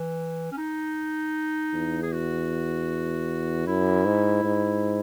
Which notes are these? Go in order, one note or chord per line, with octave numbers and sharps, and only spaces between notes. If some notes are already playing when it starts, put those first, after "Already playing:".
Already playing: E3
C#4
D#4
E2
G#4
F#4
F#2 E4
G#2
G#2